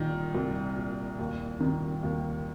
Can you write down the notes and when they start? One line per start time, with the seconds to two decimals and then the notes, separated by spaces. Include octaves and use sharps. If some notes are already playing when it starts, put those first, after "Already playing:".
Already playing: C2 A#2 D#3 D#4
0.35 C2
0.76 A#2
1.19 D#2
1.60 D#3
2.03 D#2